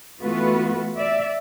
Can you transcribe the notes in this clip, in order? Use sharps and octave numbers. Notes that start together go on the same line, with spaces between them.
E3 A3 B3 F4 F#4 B4
D5 E5